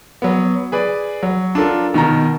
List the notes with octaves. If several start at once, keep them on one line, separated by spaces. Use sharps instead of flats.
F#3 B3
G#4 B4 D5
F#3
D4 F4 A4 A#4
B2 D#3 A#4 A#5